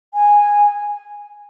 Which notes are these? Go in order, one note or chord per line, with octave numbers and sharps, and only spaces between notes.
G#5